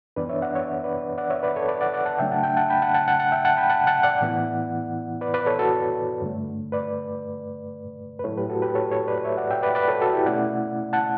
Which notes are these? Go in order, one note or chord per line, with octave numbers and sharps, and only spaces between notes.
F#2 E3 B3 D4 B4 D5
C#5 E5
D5 F#5
C#5 E5
B4 D5
D5 F#5
C#5 E5
B4 D5
A4 C#5
B4 D5
D5 F#5
D5 F#5
F#5 A5
C#3 F#3 A3 D4 E5 G5
F#5 A5
E5 G5
F#5 A5
G5 B5
F#5 A5
F#5 A5
F#5 A5
F#5 A5
E5 G5
F#5 A5
G5 B5
F#5 A5
F#5 A5
D5 F#5
A2 E3 B3 E4
B4 D5
B4 D5
A4 C#5
F#4 A4
G2 D3 A3
B4 D5
B4
A2 F#3 A3 E4 A4 C#5
G4 B4
F#4 A4
G4 B4
A4 C#5
A4 C#5
B4 D5
C#5 E5
D5 F#5
E5 G5
B4 D5
B4 D5
A4 C#5
F#4 A4
E4 G4
B2 A3 C#4 E4 D5 F#5
F#5 A5